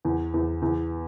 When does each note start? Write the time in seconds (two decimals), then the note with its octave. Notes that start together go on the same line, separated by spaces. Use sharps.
0.05 E2
0.34 E2
0.62 E2